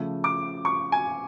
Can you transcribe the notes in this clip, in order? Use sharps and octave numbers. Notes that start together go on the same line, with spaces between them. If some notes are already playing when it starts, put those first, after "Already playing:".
Already playing: C#3 F3 A3
D6
C#6
G#5